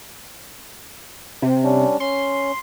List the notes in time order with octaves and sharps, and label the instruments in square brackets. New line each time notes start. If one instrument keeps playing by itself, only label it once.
[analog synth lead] C3
[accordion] G3 C#4 D4
[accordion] C#4 [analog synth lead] C6